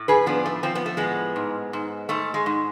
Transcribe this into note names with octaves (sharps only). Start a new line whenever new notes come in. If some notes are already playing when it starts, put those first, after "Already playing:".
Already playing: A2
G#4 B4
F3 B3 D4
A3
F3 C4
B3
A3
A2 G#3 B3
G#2
G#2
G#2 A3
G#3
G#2